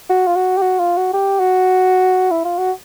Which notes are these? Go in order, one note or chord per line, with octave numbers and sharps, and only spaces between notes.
F#4
F4
F#4
G4
F#4
F4
F#4
G4
F#4
E4
F4
F#4